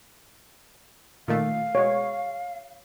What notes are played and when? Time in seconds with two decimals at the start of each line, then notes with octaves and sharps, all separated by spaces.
1.28 A#2 D#3 A3 F5
1.75 B2 G#3 C#5